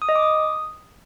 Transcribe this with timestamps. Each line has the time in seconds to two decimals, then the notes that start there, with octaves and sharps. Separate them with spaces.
0.02 D#6
0.09 D#5
0.16 D6
0.23 D#6